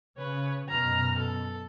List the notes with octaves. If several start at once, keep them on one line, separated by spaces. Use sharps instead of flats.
C#3 B4 C#5
F#2 B2 A#5 F6
A4